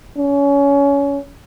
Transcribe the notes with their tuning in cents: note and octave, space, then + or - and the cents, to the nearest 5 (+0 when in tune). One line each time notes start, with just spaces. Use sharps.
C#4 +25